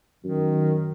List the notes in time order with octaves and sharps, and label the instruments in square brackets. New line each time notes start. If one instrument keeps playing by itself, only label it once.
[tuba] F#2 [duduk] D#3